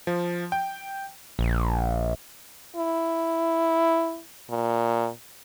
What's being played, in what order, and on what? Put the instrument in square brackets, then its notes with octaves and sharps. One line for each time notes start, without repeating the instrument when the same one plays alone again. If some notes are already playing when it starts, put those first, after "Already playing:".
[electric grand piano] F3
G5
[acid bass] A#1
[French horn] E4
A#2